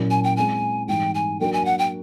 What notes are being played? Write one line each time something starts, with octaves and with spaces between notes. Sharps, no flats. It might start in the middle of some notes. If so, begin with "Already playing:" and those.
Already playing: A#2 F#3 A#3 C#4 E4
G#5
G5
G#3 C4 E4 G#5
G#2 E3 G3 G5
G#5
F#3 A#3 D4 F#4 A#4 G5
G#5
F#5
G5